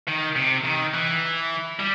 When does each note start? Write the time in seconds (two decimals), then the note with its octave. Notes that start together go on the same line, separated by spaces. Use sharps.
0.07 D#3
0.36 C3
0.65 D#3
0.94 E3
1.79 G3